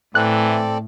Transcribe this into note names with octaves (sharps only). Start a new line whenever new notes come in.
A2 E3 C4 A4 D5 F#6